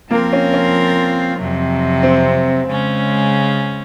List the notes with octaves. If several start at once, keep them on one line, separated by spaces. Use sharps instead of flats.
F3 A#3 C4 F4 A#4
C#4
C#4
F2 C3 F#3
C4
C#3 G#3 C#4